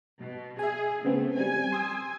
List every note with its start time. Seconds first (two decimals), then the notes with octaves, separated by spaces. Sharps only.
0.18 B2
0.59 G#4 E5 G#5
1.05 C#3 A3 B3 C4
1.37 G3 C4 G#5
1.72 C6 D#6 E6